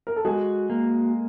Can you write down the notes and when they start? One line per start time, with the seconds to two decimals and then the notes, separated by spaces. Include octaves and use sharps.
0.07 A#4
0.16 A4
0.25 G#3 F#4 G#4
0.70 A#3